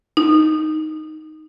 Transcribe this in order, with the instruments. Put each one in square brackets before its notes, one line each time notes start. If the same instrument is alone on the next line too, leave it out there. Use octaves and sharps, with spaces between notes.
[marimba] D#4